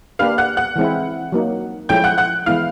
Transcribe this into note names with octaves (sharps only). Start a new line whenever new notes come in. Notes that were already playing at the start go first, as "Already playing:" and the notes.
A#3 D4 G4 B4 F5 F6
F#5 F#6
F#5 F#6
E3 G#3 C4 E4
F#3 A#3 D#4
F3 G#3 C#4 E4 A4 G5 G6
F#5 F#6
F#5 F#6
E3 G#3 B3 E4 F5 F6